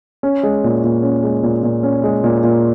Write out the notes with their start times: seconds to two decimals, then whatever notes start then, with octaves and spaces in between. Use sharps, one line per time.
0.23 C#4
0.43 G#3
0.64 A#2
0.84 A#2
1.03 C#4
1.23 G#3
1.43 A#2
1.63 A#2
1.83 C#4
2.03 G#3
2.24 A#2
2.43 A#2